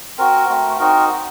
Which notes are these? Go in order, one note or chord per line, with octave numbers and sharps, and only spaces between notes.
C4 F#4 A#4
A3 C4 F#4
C4 D#4 F#4 A#4